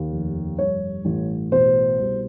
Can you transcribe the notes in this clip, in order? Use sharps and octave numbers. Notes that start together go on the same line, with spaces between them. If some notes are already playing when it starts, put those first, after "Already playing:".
Already playing: D#2
F1
G2 C#5
A1
B2 C5
C2